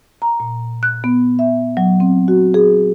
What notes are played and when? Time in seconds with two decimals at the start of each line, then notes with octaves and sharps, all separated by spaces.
0.22 A#5
0.40 A#2
0.83 F#6
1.04 B3
1.39 E5
1.77 F#3
2.00 C4
2.28 F#4
2.54 G#4